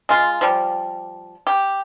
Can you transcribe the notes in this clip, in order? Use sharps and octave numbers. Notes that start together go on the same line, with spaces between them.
G#3 F4
F3 G3
G4